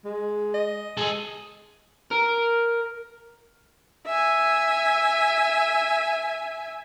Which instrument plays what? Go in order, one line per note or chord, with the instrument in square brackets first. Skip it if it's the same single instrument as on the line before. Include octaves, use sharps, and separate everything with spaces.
[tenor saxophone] G#3
[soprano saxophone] D#5
[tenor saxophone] G#3 [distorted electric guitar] G#4 A4
[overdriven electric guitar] A#4
[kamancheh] E5 G#5